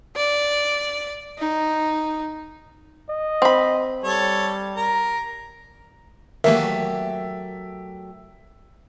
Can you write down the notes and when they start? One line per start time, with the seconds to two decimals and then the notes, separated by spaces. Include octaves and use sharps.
0.16 D5
1.39 D#4
3.09 D#5
3.42 C4 B5
4.04 G3 A4 C#5
4.77 A#4 A#5
6.44 D#3 E3 F#3 A3 A#3 G4 A#4 E5